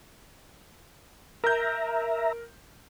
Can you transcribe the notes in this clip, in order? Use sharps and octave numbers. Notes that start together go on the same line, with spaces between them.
A#4 E5 A#5 G6